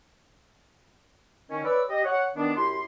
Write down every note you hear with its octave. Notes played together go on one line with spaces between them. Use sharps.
D#3 C#4
B4 C#5 D5 E5 D6 E6
G4 D#5
C#5 F#5
D#3 B3 D4
F#2 E4 G4 C6